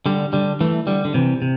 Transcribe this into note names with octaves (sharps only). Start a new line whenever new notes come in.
D3 G3
D3 G3
E3 A3
D3 G3
D3
C3 E3
C3